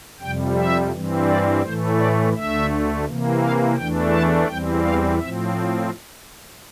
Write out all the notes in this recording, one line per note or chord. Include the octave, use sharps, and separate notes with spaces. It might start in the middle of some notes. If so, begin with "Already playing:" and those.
F2 C3 G3 G5
E5
G2 E3 G3 C4
D5
A2 E3 A3 C5
D5
D2 D3 A3 E5
C3 E3 A#3
F5
E2 E3 A3 D4 G5
A5
E2 E3 G3 C4 G5
F5
A2 F3 C4 E5